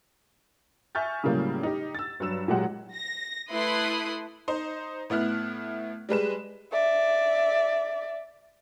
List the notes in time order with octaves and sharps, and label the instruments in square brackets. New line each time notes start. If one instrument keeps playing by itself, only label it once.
[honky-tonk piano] E5 G#5 C#6 F6 G6 A6
A2 C#3 F#3 G3 A#3
D#4 G4
E6 A6
G2 F#3 E6 E7
A#2 F#3 G#3 G4 F#5
[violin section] A#6
A3 E4 B4 C6 D#6 F#6
[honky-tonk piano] D#4 C5
A2 B3 E4 F6 F#6
G3 G#3 B4 E7
[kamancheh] D5 E5